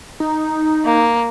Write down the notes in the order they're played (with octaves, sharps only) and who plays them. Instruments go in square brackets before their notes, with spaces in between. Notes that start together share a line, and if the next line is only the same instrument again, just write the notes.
[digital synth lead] D#4
[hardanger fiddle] A#3